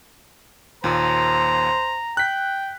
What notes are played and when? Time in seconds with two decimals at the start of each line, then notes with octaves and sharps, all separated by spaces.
0.84 D#2 A#2 C5 A#5
2.17 G5 F#6 B6